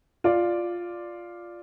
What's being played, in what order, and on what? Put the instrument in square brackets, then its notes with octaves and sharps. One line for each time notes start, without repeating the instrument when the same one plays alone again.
[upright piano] F4 D5